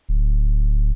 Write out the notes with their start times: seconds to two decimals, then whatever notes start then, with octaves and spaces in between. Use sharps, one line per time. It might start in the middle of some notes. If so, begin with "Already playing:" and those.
0.09 D1